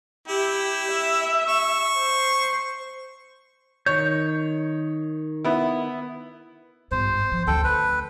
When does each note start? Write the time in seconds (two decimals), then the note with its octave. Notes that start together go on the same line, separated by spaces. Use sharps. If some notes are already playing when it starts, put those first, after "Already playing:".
0.28 E4 G4
0.91 E5
1.48 C#6
1.97 C5
3.86 D#3 C#5 G6
5.45 B3 E4
6.92 G1 G#2 C5
7.32 F3
7.47 D2 C#4 A4 G5
7.64 B4